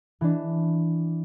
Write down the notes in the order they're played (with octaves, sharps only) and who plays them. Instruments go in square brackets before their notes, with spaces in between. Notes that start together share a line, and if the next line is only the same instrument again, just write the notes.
[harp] E3 D4